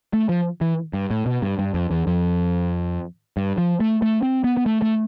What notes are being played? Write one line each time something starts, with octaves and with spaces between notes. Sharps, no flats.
A3
F3
E3
G2
A2
B2
G2
G2
F2
E2
F2
G2
F3
A3
A3
C4
B3
B3
A3
A3